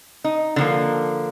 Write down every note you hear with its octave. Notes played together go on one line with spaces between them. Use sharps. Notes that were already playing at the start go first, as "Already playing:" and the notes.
D#4
D3 F3 A#3